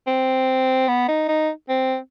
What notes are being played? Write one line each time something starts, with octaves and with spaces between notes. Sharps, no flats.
C4
B3
D#4
D#4
C4